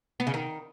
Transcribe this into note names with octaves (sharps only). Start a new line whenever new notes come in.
B3
C#3
D#3